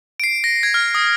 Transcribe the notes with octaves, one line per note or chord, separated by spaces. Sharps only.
D7
C7
A#6
G#6
F6
D#6